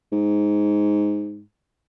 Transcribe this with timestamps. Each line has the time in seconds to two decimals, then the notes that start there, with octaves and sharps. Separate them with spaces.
0.12 G#2